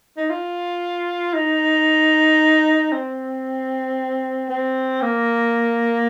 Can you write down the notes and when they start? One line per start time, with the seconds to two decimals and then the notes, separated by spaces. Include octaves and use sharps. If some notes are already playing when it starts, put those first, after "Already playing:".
0.17 D#4
0.30 F4
1.34 D#4
2.92 C4
4.49 C4
5.02 A#3